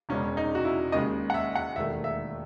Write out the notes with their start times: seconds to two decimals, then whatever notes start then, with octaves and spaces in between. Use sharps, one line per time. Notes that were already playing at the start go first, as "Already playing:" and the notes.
0.09 E1 E2 C#3 G#3 C#4
0.37 D#4
0.55 F#4
0.65 E4
0.92 D#2 C#3 G#3 D#5
1.30 F#5
1.34 E5
1.55 F#5
1.76 E1 D#2 D#3 A3 E5
2.04 E5